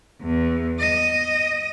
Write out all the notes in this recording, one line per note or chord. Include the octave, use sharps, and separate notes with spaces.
E2
D#5